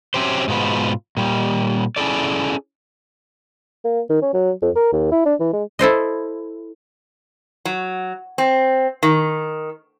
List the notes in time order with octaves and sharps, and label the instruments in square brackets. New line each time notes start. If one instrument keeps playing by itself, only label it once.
[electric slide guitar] F#3 C4 C#4 G4 C5
G#2 B2 F4 B4
A#2 G3
C#4 E4 G#4 A4 D5
[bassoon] A#3
D#3
C#4
F#3
F2
A#4
D#2
E4
D4
E3
G#3
[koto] E4 A4 C5 D#5
[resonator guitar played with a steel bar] F#3
C4
D#3